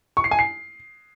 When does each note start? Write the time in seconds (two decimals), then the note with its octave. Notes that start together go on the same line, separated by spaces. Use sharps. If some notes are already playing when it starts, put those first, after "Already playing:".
0.17 C#6
0.24 C7
0.31 G#5
0.39 C7